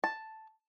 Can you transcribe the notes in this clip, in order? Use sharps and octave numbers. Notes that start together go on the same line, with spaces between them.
A5